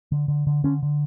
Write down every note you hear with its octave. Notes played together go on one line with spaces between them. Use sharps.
D3
D3
D3
D3 C#4
D3